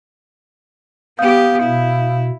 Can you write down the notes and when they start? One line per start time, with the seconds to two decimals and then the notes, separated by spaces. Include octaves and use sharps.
1.19 B3 G4 F5 D#6 G6
1.63 B2 E4